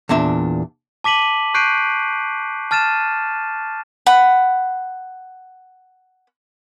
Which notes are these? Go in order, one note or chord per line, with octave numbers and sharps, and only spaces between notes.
E2 A#2 D4 E5
A5 D6 B6 D#7 F#7
C#6 F#6 G6 C7 D7 D#7
A5 F6 A6 D#7 E7
F#5 B5